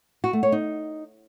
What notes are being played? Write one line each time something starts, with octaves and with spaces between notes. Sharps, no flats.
F#4
A3
C#5
D#4